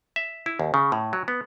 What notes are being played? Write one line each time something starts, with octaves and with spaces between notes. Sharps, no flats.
E5
E4
D#2
C#3
A2
F#3
B3